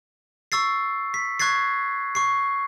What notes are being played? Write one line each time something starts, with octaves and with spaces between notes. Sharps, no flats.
C#6 E6 A6 C7
B6
C#6 F#6 G#6 A6 C7
C#6 C7